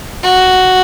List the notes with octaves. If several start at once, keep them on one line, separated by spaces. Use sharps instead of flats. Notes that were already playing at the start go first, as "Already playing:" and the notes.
F#4